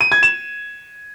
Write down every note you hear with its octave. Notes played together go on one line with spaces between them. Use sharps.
D#7
G#6
E7